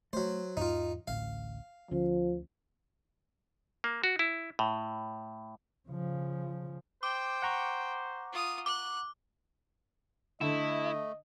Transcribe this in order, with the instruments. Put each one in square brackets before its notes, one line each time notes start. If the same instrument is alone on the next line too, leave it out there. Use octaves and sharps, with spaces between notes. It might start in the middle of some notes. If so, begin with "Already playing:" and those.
[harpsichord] F#3 C5 [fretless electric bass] A3
[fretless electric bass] E2 G#2 [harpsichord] D#4 F4
[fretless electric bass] A1 D2 A2 [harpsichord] F5
[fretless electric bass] D2 D3 C#4 [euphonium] F3
[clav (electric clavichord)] A#3
F#4
E4
A2
[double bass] C#3 F3
[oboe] C5 [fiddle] G5 [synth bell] D6
[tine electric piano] F#5 A#5 C#6
[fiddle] F4 D#6
[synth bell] D6 [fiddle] F#6
[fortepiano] D3 [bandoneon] A3 [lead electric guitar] E4 [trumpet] D#5